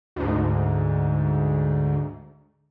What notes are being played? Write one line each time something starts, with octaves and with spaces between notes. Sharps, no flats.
D2 G#2